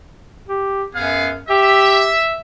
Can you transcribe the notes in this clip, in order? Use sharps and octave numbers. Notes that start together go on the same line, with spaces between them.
G4
F#2 B3 G#4 F5
G4 E5